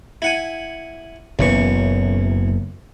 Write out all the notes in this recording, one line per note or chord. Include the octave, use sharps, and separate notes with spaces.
E4 F#5 G#5
F#1 B1 F#2 E3 C#6